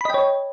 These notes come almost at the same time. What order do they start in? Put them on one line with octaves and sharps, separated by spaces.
B5 D#5 G5 C#5